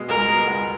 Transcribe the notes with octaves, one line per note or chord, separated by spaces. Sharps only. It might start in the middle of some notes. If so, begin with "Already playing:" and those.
Already playing: B2 G#3
C#2 A#4
B2 G#3
C#2